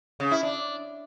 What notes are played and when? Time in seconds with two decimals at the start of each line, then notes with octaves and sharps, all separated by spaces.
0.20 C#3
0.31 E4
0.43 D4